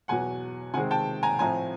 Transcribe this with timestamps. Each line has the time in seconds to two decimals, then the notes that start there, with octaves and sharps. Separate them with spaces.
0.08 E2 B2 F#3 F#5 G#5
0.74 C3 D#3 G#3 C4 F#5 G#5
0.91 G5 A5
1.23 G#5 A#5
1.39 A2 F3 A3 C4 G#5 A#5